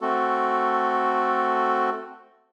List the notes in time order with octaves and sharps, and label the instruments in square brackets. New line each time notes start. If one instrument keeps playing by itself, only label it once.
[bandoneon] A3 C4 F#4 A4